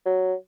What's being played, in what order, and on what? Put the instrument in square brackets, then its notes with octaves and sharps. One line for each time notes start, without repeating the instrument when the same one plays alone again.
[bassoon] F#3